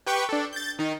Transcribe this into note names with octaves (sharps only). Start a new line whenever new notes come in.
G4 B4 G5 C#6
D4 A4
G6 A6
D#3 D#4